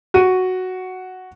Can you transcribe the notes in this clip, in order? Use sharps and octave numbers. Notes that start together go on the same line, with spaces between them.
F#4 D#7